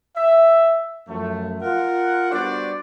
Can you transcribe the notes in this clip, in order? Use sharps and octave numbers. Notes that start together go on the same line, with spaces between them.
E5
F#2 F3 A3
F4 A#4 F#5
G3 B3 D4 F#4 C5 D5